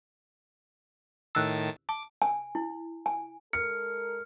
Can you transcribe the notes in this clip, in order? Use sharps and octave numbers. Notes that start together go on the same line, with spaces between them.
A2 D#3 A5 E6 F#6
A5 D6
G#5
E4
G#5
G#3 A4 A#4 F6 C#7